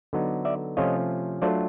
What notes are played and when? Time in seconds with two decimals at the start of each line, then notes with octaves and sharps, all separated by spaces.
0.13 D3 F#3 B3 D#4
0.45 D5 E5
0.77 C3 F3 A3 C#4 F4 C#5 D#5
1.42 F#3 A3 D4 F4 C5 D5